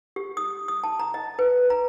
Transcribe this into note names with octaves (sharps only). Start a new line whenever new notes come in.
G4
D#6
D#6
A5
A#5
D#5
B4
A#5